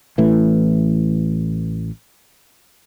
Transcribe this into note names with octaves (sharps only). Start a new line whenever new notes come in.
A1 A2 E3